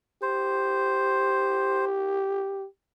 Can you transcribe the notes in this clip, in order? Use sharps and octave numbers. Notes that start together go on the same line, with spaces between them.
G4 C5